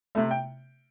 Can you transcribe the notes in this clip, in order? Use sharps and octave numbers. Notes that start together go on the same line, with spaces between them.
C3 A3
G5